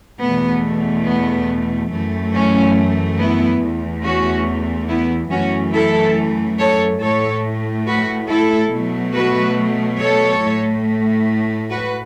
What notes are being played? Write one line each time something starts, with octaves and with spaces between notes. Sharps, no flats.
E2 B2 A3 B3
B3
F#2 E3 A3
C#4
B3 E4
E2 E3 A3
C#4 F#4
B3 E4
F#2 E3 A3 C#4 F#4
E4 A4
A4 C#5
A2 A3 A4 C#5
F#4 B4
E4 A4
B2 F#3 A3
F#4 B4
A4 C#5
A2 A3
F#4 B4